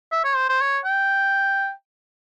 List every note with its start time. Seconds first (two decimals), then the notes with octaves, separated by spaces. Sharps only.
0.12 E5
0.24 C#5
0.36 C5
0.49 C5
0.61 C#5
0.85 G5